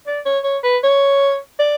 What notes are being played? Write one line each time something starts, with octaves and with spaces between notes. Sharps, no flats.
D5
C#5
C#5
B4
C#5
D5